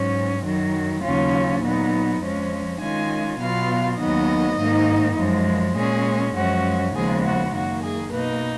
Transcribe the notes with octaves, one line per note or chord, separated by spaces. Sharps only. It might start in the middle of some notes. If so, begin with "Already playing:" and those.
Already playing: G#2 F#3 C#4
F#2 D#3 F#3
D#2 C#3 F#3 C#4 F4
A#2 F#3 B3 D#4
F2 F3 G#3 C#4
D#3 G#3 C#4 F4 G#5
B2 F#3 B3 F4 F5
D#2 D#3 F#3 B3 D#4 D#5
G#2 D#3 A#3 D#4
F#2 F3 G#3
A#2 G#3 C#4 G#4
F#2 F3 G#3 C#4 F#4
D#2 C#3 F3 G#3 B3 G#4
F#4
F#2 D#3 A#3 F#4
G#4
B2 A#3 D#4 B4